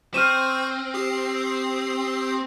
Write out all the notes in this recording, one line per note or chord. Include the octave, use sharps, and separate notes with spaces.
C4 C5 C#6 F6 D#7 E7
G4 D#6 C7